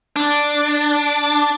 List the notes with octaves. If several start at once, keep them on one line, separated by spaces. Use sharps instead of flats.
D4